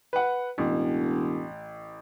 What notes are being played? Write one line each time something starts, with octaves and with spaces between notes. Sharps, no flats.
B4 F#5
E1 A1